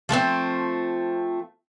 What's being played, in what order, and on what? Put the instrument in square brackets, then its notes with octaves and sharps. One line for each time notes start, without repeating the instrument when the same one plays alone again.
[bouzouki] F3 A3 B3 C4